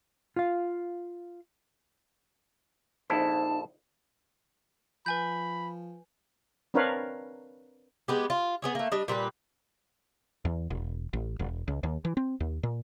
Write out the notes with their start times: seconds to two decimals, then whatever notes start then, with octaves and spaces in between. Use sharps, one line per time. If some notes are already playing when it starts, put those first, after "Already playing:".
0.36 F4 F5
3.10 A#1 F2 D#4 E4 C5 A5
5.06 F3 B4 G#5 B5 G6
6.74 C4 D4 A#4 B4 C#5 F5
8.08 G#3 B3 G4
8.30 F4
8.62 B3 G#4 C#5
8.75 A3 A#3
8.92 G3 D4 D#5
9.08 A#2 G3 A4 B4
10.45 E2
10.70 E1
11.13 A1
11.39 E1
11.68 C#2
11.83 D#2
12.05 E3
12.17 C4
12.40 D#2
12.63 A#2